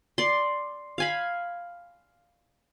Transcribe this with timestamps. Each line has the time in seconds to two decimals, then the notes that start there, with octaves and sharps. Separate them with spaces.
0.18 D5 C6
0.98 F5 G#5 B5